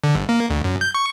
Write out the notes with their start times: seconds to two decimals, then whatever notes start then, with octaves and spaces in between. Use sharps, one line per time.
0.04 D3
0.15 G1
0.29 A#3
0.50 D2
0.64 F#2
0.81 G6
0.95 C#6